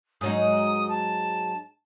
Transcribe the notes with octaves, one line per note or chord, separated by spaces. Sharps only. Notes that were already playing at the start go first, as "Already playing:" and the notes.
G#2 F#3 D#4 D#6
A5